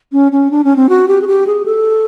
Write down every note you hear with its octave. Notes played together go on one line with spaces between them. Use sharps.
C#4
C#4
D4
C#4
C4
F#4
G4
G#4
G4
G#4
A4